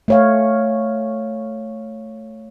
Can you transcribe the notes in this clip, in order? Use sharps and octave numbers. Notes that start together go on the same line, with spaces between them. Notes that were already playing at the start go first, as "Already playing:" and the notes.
A3 C#5 F5